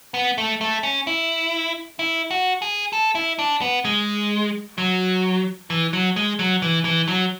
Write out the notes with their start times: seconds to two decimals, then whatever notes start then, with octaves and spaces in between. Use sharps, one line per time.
0.14 B3
0.38 A3
0.61 A3
0.83 C#4
1.07 E4
1.99 E4
2.31 F#4
2.62 G#4
2.93 A4
3.15 E4
3.39 D4
3.61 B3
3.85 G#3
4.78 F#3
5.70 E3
5.93 F#3
6.16 G#3
6.39 F#3
6.62 E3
6.85 E3
7.08 F#3